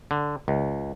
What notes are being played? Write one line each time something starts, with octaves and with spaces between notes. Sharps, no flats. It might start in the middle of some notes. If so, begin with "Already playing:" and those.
D3
C#2